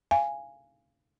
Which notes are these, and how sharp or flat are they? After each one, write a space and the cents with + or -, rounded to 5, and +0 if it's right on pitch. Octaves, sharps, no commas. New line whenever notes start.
F5 -20 G#5 -5